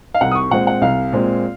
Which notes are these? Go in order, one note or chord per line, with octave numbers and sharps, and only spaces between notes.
F5
C2 F#5
D#6
C#6
A#2 G#3 C4 F#5
F#5
C2 F5
A#2 G#3 C4